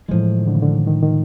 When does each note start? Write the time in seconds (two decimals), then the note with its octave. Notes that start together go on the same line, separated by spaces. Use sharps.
0.09 A2 E3 F3 G#3
0.40 D#3
0.47 D3
0.55 C#3
0.63 D3
0.72 D#3
0.87 D#3
1.02 D#3